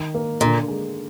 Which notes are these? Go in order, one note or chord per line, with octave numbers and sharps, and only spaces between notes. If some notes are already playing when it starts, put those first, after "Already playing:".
Already playing: D#3
A#3
A#2 D3
G#3